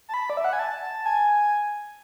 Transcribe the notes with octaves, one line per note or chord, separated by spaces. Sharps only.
A5
B5
D5
E5
F#5
G#5
A5
G#5